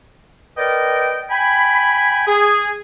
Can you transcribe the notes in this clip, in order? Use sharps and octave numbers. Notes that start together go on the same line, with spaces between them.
A#4 B4 D5 D#5 G5
G5 G#5 B5
G#4